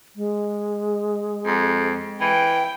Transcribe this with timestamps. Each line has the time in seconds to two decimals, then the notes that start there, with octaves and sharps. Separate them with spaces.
0.16 G#3
1.46 F2
2.21 E3 G5